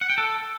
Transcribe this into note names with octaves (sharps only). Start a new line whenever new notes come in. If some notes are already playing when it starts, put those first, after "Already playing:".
F#5
G5
A4